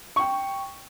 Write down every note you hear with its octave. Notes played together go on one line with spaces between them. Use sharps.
G5 C#6